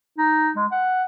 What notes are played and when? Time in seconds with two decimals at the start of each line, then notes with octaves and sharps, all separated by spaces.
0.18 D#4
0.56 G#3
0.72 F#5